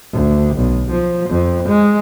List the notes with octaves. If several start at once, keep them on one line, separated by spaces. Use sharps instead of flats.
D2
B1
F3
F2
G#3